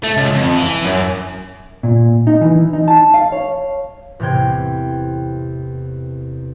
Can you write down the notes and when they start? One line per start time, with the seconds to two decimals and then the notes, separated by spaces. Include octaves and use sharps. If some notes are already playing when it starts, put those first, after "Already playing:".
0.04 A3
0.17 C#2
0.35 F2
0.56 E3
0.85 F#2
1.83 A#2
2.27 D#4
2.41 E3
2.73 D#4
2.88 A5
3.14 F5
3.32 C#5
4.20 E2 A2 C3 G5 G#6